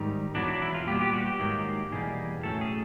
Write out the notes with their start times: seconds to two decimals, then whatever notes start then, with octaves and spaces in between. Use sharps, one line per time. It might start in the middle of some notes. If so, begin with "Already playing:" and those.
Already playing: G#2 D#3 G3 D#4
0.35 E2 B2 F#3 B3 D4
0.48 D4
0.62 E4
0.74 F4
0.87 A#2 G3 B3 G4
1.01 G4
1.13 F#4
1.26 G4
1.39 G#2 D#3 F#3 A#3
1.92 E2 B2 G3 A#3 G#4
2.43 A2 F#3 A3 C#4 A4
2.61 G#4